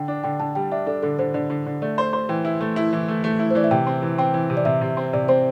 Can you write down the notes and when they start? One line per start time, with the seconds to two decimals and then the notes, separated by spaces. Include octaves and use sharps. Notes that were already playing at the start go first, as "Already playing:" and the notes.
Already playing: D3 G5
0.08 D4
0.24 D3 G5
0.40 D3 A5
0.55 G3 G5
0.71 D4 E5
0.87 D4 A4
1.03 D3 A4
1.19 D3 C5
1.34 D3 D5
1.50 D3
1.66 D3
1.82 A3 D5
1.98 C5
2.13 C5
2.29 E3 G5
2.45 E4
2.61 A3
2.76 E4
2.93 E3
3.08 A3
3.24 A3
3.39 E4
3.51 C5
3.55 E3 D5
3.64 E5
3.71 C3 G5
3.87 C4
4.02 E3
4.18 C4 G5
4.34 E3
4.50 C3
4.57 D5
4.65 C3 E5
4.81 C3
4.97 C4
5.13 C3 D5
5.29 C4 C5